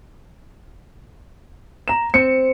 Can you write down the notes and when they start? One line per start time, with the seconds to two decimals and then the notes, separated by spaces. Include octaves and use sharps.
1.88 A#5 E7
2.14 C4 C#7